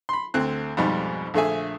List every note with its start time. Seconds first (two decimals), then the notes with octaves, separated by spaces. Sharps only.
0.09 B5 C6
0.34 D2 D3 C4 F#6
0.77 F2 G#2 B2 G3
1.34 A#1 D3 A3 G#4 E5 G#5